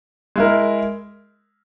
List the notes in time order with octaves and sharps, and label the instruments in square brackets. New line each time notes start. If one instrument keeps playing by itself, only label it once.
[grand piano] G#3 E4 A#4